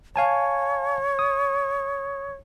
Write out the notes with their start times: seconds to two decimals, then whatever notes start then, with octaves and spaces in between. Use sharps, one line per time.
0.16 C#5 F5 G#5 A5
1.19 D#6